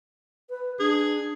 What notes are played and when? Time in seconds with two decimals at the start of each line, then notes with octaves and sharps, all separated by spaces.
0.50 B4
0.80 D4 G#4